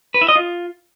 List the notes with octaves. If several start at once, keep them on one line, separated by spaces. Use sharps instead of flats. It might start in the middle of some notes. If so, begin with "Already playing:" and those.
B4
E4
D#5
F4